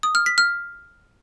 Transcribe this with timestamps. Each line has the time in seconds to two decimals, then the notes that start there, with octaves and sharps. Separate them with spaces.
0.03 D#6
0.15 F6
0.26 B6
0.38 F6